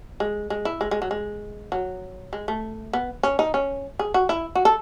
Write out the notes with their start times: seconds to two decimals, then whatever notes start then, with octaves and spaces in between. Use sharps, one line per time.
0.20 G#3
0.50 G#3
0.65 E4
0.81 G#3
0.91 G#3
1.02 F#3
1.11 G#3
1.72 F#3
2.33 G#3
2.48 A3
2.93 B3
3.23 C#4
3.39 D#4
3.54 C#4
3.99 G#4
4.14 F#4
4.29 E4
4.55 F#4
4.65 A4